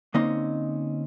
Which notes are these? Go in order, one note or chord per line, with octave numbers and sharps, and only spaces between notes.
D3 A#3 C4 C#4 D#4 D#5